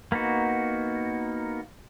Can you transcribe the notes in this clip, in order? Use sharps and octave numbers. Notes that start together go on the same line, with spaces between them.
A#3 B3 D#4 F#4